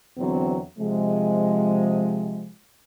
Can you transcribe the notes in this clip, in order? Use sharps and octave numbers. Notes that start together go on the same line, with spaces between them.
E2 B2 D3 F#3 C4
C3 F3 G#3